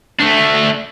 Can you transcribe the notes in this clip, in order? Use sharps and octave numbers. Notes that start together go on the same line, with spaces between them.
A3 D4